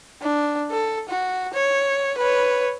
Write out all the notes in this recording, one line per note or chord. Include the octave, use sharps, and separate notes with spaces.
D4
A4
F#4
C#5
B4 C#5